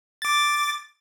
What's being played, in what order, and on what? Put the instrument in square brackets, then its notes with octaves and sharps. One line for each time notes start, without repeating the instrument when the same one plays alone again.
[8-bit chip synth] D6 A6